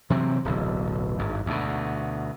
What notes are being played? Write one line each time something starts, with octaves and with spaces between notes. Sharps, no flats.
C3 E3 F#3 C4
D1 B1
G#1 G2
D2 B2